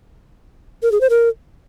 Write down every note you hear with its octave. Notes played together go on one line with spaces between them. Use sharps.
A#4
G#4
C5
A#4